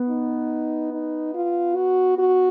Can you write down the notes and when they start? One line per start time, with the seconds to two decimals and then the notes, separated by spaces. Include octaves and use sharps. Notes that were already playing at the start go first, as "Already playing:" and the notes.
Already playing: B3
0.09 D#4
0.92 D#4
1.34 F4
1.76 F#4
2.18 F#4